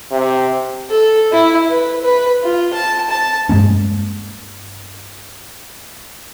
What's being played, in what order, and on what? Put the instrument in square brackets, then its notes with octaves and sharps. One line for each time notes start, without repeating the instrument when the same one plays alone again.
[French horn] C3
[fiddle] A4
E4
B4
B4
F4
A5
A5
[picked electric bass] G2 G#3 A#3 C#4